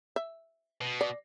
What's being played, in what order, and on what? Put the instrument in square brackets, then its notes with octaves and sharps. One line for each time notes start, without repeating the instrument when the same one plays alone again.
[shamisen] E5
[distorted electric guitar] B2
[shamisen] D5